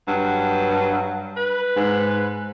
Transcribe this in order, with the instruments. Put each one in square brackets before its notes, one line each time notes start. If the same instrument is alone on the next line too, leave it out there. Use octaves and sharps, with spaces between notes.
[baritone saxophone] G2 [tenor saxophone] F#3
[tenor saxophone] B4
[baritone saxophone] G#2